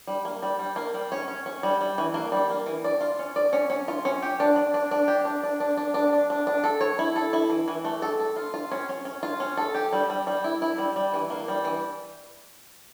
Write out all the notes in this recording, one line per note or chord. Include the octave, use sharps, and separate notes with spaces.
G3
A#3
G3
G3
A#3
G3
C#4
C#4
C#4
G3
G3
E3
A#3
G3
A#3
E3
D5
F4
C#4
D5
C#4
C#4
F4
C#4
G4
D4
D5
D4
D4
G4
D4
D4
D4
D4
D4
D4
D4
D4
A4
C#5
E4
A4
E4
E3
E3
A3
A4
A4
F4
F4
C#4
C#4
C#4
F4
C#4
A4
G4
G3
G3
G3
E4
E4
G3
G3
E3
A#3
G3
E3